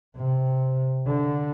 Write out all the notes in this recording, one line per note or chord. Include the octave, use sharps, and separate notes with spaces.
C3
D3